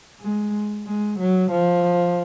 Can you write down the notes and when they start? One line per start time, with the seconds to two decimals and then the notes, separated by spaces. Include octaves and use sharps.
0.21 G#3
0.86 G#3
1.19 F#3
1.51 F3